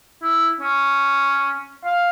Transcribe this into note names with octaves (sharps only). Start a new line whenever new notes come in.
E4
C#4
F5